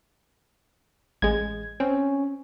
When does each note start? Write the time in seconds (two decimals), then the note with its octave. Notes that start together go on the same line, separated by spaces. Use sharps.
1.22 A1 G#3 G#6
1.80 C4 C#4